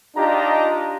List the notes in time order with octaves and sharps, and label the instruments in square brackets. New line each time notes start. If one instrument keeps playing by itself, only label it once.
[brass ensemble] D4 D#4 F4 G4 D#5 A#5